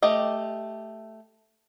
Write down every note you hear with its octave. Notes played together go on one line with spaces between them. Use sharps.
A3 G4 D#5